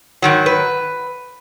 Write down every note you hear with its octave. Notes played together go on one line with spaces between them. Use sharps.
G#2 D#3 F#3
B4